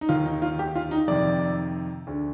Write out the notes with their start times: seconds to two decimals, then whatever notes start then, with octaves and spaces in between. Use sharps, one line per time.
0.01 D#4
0.09 D#2 D#3 F4
0.26 D#4
0.42 F4
0.59 G4
0.76 F4
0.91 D#4
1.08 F2 C3 D#3 D5
2.07 D2 D3